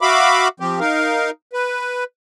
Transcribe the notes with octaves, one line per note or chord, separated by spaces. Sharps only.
F#4 E5 F5 B5 D6
F3 C4 G4
D#4 A#4 F5
B4